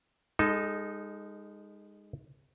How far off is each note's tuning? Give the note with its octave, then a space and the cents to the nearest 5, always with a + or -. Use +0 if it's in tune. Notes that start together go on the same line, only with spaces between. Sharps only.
G#3 -30 D#4 -5 A4 +0